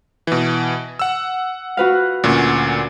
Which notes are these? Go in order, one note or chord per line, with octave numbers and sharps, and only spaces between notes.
B2 E3
F#5 E6
F#4 B4 F5
D2 A#2 C#4